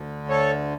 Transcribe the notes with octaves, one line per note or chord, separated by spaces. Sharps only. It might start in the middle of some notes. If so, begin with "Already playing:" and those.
Already playing: D2 D3
A4 C#5